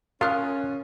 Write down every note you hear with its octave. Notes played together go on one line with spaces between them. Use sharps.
C#4 F4 A#4 F5 D#6 F#6